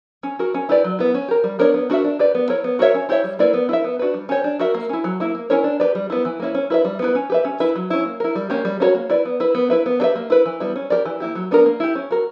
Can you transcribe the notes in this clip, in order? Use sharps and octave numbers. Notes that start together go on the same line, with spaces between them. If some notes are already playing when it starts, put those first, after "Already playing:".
C#4
F#4 A#4
C#4
E4 G4 B4 D5
F#3
B3 E4
C#4
G4 A#4
G3
B3 D4 A#4 C#5
B3
D4 F#4 A#4 E5
D4
G4 B4 D5
B3
E4 A#4 C#5
B3
F#4 A#4 C#5 E5
C#4
E4 G4 C#5 E5
G3
A#3 E4 B4 D5
B3
E4 A#4 E5
B3
D4 F#4 B4
G3
C#4 G4 C#5
D4
F#4 A#4 E5
A#3
C#4 E4
F#3
A#3 E4
A#3
C#4 E4 A#4 C#5
D4
G4 B4 D5
G3
B3 E4
E3
A#3 C#4 E4
C#4
E4 B4 E5
G3
B3 E4 B4
C#4
G4 B4 E5
C#4
E4 B4 E5
F#3
C#4 E4
A#3
E4 A#4
G3
A#3 C#4 G4
G3
C#4 F#4 A#4 C#5
A#3
E4 B4 D5
B3
E4 B4
B3
E4 B4 E5
B3
D4 G4 B4 E5
A#3
E4 B4
E3
G3 B3 E4
C#4
G4 A#4 D5
E3
A#3 E4 G4
F#3
B3 D4 A#4
A#3
E4 G4
C#4
F#4 A#4